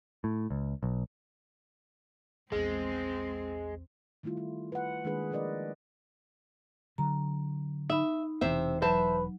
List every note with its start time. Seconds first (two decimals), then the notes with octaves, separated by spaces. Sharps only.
0.24 A2
0.50 C#2
0.83 B1
2.52 A#1 E2 G#3 C4 G#4
4.23 D#3 G3 A3 E4 F4
4.37 F4
4.72 B4 F#5
5.04 D#3 G#3 A#3 D4 G#4 B4
5.31 F3 D4 A#4 B4 D5 D#5
6.98 D3 F#3 A#5
7.90 D#4 E5 B5
8.41 E1 C3 E3 C5 E5
8.82 F#3 B4 C5 E5 A5